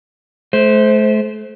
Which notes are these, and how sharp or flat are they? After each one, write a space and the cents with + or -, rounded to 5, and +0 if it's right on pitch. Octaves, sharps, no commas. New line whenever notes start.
A3 -35 C5 +0